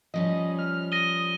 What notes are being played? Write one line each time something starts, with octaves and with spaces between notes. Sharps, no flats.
F3 G3 C#4 D#5
F6
D#6 A#6 D#7 G7